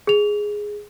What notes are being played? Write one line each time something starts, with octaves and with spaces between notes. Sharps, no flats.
G#4 F7